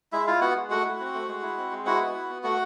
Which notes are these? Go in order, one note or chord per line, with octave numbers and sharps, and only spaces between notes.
G#3 E4 E5
E4 F4 F5
B3 F#4 F#5
G#3
A3 F#4 F#5
E4
C4
A3
G#3
E4
C4
G#3
E4 F#4 F#5
B3
E4
B3
A3 F#4 F#5